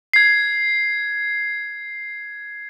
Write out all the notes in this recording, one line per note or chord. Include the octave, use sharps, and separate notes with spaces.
G#6 C7